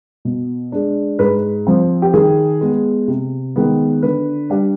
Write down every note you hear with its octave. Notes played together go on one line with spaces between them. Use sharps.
B2
G#3 D4
G#2 B4
F3 C4
G4
D#3 G#4
G#3 B3
C3
D#3 G#3 B3
D3 B4
G3 D4